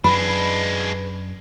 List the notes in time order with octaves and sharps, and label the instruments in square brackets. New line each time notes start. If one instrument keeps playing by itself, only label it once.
[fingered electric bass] F#2 [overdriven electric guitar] G#3 D4 [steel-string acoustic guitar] B4 [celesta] B5